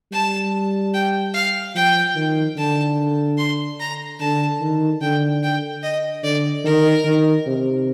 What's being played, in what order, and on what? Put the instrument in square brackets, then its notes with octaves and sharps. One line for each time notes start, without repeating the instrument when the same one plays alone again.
[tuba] G3 [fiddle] A5
[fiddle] G5
F5
[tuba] F3 [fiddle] G5
[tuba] D#3
[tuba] D3 [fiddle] A5
[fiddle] C6
A#5
[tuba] D3 [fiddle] A5
[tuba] D#3
[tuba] D3 [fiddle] G5
[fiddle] G5
D#5
[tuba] D3 [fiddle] D5
[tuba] D#3 [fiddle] A#4
[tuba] D#3
C3